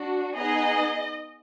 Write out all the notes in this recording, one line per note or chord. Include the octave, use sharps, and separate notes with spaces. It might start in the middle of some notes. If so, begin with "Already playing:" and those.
Already playing: D4 F#4
B3 D#4 G#4 D#5